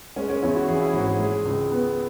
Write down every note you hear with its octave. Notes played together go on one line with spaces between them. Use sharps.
G#3 C#4
C#4
E2 E4
F#4
E3 G#4
E4
G#1 F#4
G#4
G#3
C#2
B3